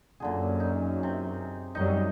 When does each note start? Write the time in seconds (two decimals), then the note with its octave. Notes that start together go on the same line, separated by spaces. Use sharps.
0.20 F#2 A#2 D3 G#4
0.60 D#4
1.03 C3
1.75 F#2 F#3 G3 D#4 D#5